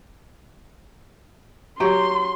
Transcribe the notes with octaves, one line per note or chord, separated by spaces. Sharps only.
F#3 G4 C6